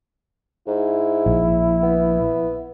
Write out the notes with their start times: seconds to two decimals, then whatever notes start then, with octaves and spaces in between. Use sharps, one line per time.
0.67 G#2 E4
1.26 A#1
1.83 B3